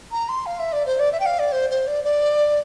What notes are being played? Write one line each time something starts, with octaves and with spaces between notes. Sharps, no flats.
A#5
C6
F5
E5
D5
C5
D5
E5
G5
F5
D5
C5
C5
D5
D5